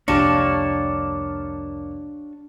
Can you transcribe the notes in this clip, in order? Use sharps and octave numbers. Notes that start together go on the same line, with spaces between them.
C2 F2 A#3 D4 G4 C#5 F5 A5